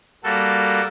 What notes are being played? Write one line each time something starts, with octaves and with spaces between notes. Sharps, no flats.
G3 A#3 F#4 A4